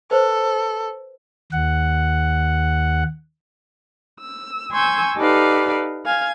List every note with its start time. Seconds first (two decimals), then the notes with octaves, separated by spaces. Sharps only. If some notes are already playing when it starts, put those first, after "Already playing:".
0.11 A4 B4 C5
1.52 D#2 F#5
4.20 E6
4.72 G#5 C6 C#6 E6 G6 G#6
5.17 D#4 G4 A4 B4 D5 F5
6.04 F5 G#5 G#6